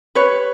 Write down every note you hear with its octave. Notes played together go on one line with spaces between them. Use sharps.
G4 B4 C#5